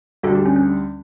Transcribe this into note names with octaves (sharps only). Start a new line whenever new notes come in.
D2 D3 G3 F#4 A4
G4
C#4
C#4